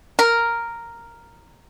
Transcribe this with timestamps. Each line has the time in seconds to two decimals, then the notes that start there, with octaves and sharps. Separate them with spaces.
0.19 A#4